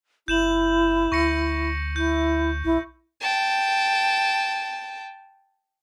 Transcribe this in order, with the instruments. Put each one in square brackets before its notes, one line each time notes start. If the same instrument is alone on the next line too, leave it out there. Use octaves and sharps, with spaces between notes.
[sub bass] F#1 [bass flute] E4 [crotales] G6 E7 F#7
[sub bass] D2 [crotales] C#6 A#6 C#7
[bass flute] E4 [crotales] G6
[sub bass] B1 [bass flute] E4
[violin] G5 A5